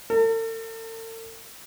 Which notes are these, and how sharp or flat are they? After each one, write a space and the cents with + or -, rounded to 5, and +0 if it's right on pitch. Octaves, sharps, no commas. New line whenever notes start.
A4 +45